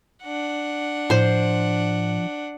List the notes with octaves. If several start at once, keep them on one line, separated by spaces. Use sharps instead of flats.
D4 F#5
A2 F3 C5 C6